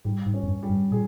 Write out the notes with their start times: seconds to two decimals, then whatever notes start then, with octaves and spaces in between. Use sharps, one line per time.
0.05 G#2 G3
0.26 G#2
0.34 C#4
0.43 E2
0.48 G2
0.63 G3
0.69 G2
0.91 A#2 G#4